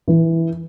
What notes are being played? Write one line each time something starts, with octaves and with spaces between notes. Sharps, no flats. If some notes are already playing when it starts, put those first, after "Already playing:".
E3